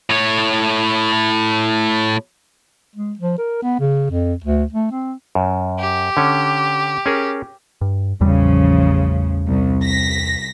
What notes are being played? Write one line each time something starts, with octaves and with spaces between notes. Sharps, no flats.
A2 C#5
G#3
F3
A#4
B3
C#3
F2
D2
A3
C4
F#2
G4
D3 C#4
C#4 G#4 A#4
G2
A1 E2 C#3 F3 G3
C2
A#6 B6